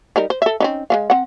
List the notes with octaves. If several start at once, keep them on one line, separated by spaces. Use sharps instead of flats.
G3 D#4 A#4
C5
A4 E5
C4 C#4 D#4
G#3 B3 F5
C4 F#5